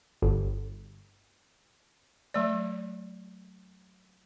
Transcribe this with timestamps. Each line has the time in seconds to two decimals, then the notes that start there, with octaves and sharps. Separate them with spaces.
0.22 G1
2.34 F#3 A3 D5